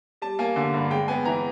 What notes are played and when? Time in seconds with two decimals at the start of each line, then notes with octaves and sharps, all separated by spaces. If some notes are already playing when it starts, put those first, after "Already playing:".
0.22 G3 A5
0.39 A#3 G#5
0.56 D3
0.74 G2
0.91 G#3 G5
1.08 B3 G#5
1.25 E3 A#5